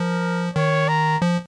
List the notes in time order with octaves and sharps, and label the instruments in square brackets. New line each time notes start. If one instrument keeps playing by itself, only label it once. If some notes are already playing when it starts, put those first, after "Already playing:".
Already playing: [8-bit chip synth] F3 [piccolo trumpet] A#4
[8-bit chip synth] D#3 [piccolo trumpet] C#5
[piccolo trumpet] A#5
[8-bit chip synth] F3